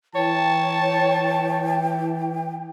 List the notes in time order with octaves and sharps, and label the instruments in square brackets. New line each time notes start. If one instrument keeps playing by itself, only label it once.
[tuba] E3 [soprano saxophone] C#5 [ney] G5 [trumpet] A5